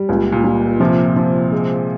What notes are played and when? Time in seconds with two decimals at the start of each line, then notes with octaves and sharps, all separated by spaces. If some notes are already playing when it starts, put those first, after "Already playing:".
Already playing: G3
0.09 C#2 A#2
0.32 A#2
0.44 G3
0.80 C3 F3
1.16 F3
1.52 G#3